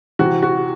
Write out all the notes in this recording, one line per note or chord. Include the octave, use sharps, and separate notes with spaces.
C3 E3 F#4
F#4